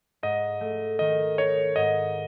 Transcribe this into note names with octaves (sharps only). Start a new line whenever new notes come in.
G#2 D#5
A3
D#3 D#5
D#4 C#5
G#2 D#5